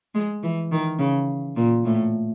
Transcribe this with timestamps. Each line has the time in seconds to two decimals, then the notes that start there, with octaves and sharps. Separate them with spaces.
0.15 G#3
0.43 E3
0.72 D#3
0.99 C#3
1.56 A#2
1.85 A2